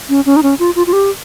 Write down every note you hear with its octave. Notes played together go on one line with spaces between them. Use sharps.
C#4
C#4
D#4
C#4
F4
F4
F4
G4